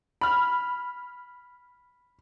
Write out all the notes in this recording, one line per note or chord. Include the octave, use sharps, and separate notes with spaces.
B5 F6